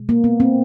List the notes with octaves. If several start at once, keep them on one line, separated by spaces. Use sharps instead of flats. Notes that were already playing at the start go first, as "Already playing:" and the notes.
Already playing: B2 G#3
A#3
B3
C4